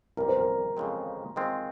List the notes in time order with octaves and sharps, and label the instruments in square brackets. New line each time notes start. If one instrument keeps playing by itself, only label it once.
[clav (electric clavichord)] C2 C3 G3 [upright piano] A#4
[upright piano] C5
A#4
[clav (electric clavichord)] F2 C#3 F3 G#3 C4
D#3 G#3 C4 F4